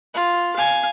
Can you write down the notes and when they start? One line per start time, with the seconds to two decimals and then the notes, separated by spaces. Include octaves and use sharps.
0.15 F4
0.56 F5 G#5